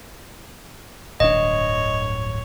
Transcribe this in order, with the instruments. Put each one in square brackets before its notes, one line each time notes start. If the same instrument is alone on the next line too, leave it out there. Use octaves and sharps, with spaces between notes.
[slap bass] D1 G1 D4 [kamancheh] C#5 [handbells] D#5